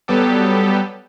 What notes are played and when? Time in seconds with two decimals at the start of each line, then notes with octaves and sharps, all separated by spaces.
0.08 F#3 G3 B3 G4 A4